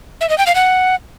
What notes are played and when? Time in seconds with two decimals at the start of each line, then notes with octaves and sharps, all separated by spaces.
0.21 E5
0.29 D#5
0.38 G5
0.47 F5
0.55 F#5